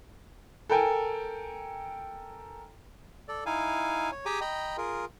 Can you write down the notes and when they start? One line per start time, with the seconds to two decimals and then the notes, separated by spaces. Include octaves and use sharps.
0.69 A4 A#4 G5 G#5
3.28 A4 D5
3.46 D#4 E4 F5 G#5
4.12 C#5
4.26 G4 G#4 G5 G#5 A#5 D6
4.41 D#5 G5 A#5 B5
4.78 F4 G#4 A#4